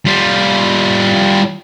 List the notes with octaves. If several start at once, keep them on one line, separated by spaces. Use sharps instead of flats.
G3 F4